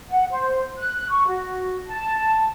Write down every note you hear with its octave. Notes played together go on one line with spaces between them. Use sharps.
F#5
C5
F#6
C#6
F#4
A5